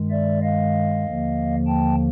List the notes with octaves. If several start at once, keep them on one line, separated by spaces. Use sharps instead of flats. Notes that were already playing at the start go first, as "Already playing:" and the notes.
Already playing: G2 D#3 G#3
D5 E5
D#5 F5
D#2 D3 F3 A#3
G5 A5